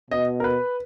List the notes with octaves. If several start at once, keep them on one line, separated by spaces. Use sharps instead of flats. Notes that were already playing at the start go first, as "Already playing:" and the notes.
B2 D#5
A#4
B4